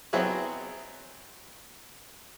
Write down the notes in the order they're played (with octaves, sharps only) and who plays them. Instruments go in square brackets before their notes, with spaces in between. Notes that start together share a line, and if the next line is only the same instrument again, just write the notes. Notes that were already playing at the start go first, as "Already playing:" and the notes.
[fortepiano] F#3 B3 C4 E4 F#4 G#4